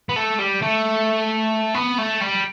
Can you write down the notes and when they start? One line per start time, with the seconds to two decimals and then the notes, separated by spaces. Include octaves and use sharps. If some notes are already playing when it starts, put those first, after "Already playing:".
0.09 B3
0.16 A3
0.39 G3
0.62 A3
1.75 B3
1.98 A3
2.21 G3